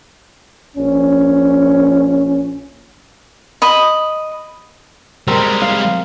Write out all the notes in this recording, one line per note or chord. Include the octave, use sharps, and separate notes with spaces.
A#1 C#4
D#5 B5
G3 G#3 C4 A#4
F5